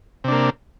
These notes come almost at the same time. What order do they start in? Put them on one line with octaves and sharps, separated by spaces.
C3 D4 A#3